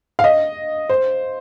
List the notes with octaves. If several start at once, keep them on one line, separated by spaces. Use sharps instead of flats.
F5
D#5
C5